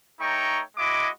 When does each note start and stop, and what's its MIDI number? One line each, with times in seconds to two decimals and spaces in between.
0.20 0.61 57
0.20 0.61 63
0.20 0.61 73
0.20 0.61 79
0.20 0.61 82
0.20 0.61 85
0.77 1.09 56
0.77 1.09 64
0.77 1.09 66
0.77 1.09 75
0.77 1.09 86